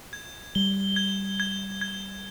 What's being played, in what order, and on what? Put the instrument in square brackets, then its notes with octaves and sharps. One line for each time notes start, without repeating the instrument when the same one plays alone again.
[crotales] G#6
[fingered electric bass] G3 [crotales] G7
[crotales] G#6
G#6
G#6